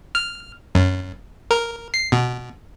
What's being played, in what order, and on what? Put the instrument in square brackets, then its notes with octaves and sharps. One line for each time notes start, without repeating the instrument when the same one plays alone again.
[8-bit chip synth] F6
F#2
A#4
C7
B2